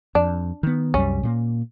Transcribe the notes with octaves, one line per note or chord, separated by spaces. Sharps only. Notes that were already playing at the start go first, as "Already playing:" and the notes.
F2 D4
D#3 B3
C2 F#2 G3 C#4
A#2 G#3 A#3